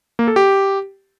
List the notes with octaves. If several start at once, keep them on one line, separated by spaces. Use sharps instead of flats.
A#3
A4
G4